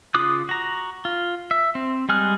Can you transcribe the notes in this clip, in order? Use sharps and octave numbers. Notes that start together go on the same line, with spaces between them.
C#3 F4 D6 D#6 F#6
F#4 A#5
F4
E5
C4
G3 G#3 G#4 F6 F#6